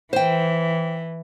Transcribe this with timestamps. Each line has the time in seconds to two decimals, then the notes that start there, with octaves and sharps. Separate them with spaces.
0.13 E3 C5 G5